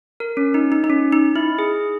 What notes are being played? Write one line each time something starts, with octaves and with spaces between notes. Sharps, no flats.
A#4
C#4
D#4
D#4
D#4
C#4
D#4
E4
G#4